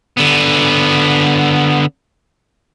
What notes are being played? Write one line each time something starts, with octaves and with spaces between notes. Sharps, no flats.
D3 B3